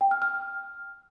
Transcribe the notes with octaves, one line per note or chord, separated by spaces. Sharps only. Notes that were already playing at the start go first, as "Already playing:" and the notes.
G5
F6
F6